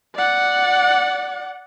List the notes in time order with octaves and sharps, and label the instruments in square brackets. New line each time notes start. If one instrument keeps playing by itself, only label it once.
[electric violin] D5 F#5